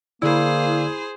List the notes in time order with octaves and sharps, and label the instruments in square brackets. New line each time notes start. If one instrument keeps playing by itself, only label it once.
[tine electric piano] D3 D5 E6 [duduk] A#3 [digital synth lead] E4 [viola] G#4 C5